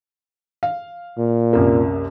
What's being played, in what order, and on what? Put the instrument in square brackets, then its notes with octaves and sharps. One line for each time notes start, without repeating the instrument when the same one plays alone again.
[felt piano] F5
[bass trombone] A#2
[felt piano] C2 F#2 A#3